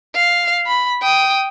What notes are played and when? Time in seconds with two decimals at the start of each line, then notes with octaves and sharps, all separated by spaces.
0.15 F5
0.67 B5
1.02 G5 D#6